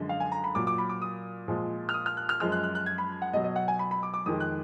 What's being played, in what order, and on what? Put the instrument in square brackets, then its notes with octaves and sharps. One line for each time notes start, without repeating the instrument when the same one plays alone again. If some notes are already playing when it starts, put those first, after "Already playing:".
Already playing: [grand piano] F#2 D3 F3 G#3
F5
G#5
A#5
B5
A#2 F#3 D6
D6
B5
D6
D#6
A#2 F3 G#3
F6
D#6
F6
F#6
F6
F#2 F3 G#3 F6
F#6
F#6
F#6
G#6
B5
F#5
B2 D#5
F#3
D#5
F#5
G#5
B5
B5
D6
D6
F2 D#3 G#3 D#6
F#6